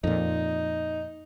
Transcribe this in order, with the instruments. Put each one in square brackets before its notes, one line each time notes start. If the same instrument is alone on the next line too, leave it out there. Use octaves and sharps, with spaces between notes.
[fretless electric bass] F2 A#2 [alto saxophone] D#4